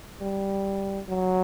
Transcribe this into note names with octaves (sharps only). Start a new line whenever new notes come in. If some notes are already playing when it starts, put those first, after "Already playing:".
G3
F#3